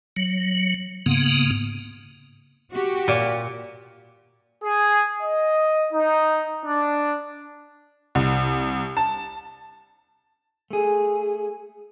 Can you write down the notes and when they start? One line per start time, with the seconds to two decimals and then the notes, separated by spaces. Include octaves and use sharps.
0.16 F#3
1.06 G#2 C#3 A#3 B3
2.71 F#4 G4
3.08 A#2
4.64 G#4
5.23 D#5
5.93 D#4
6.66 D4
8.15 C2
8.97 A5
10.70 A3 G#4